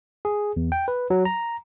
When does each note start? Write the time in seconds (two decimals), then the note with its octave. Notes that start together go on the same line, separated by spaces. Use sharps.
0.25 G#4
0.57 E2
0.72 G5
0.88 B4
1.10 F#3
1.25 A#5